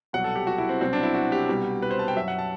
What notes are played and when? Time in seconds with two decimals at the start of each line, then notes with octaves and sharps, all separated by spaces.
0.13 C2 B2 F#3 F#5
0.24 A4
0.36 G4
0.47 F#4
0.58 E4
0.69 C4
0.81 C2 B2 F#3 C4
0.93 D4
1.03 E4
1.14 F#4
1.32 G4
1.48 C2 B2 G3
1.82 B4
1.91 C5
1.99 A5
2.08 G5
2.16 F#2 F#3 E5
2.28 F#5
2.39 A5